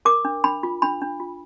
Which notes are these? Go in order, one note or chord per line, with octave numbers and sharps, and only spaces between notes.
A#4 D6
D4
D4 B5
F4
D4 B5
D4
F4